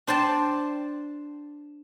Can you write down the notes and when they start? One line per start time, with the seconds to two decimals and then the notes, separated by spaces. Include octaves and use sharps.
0.07 D4 C5 G5 A5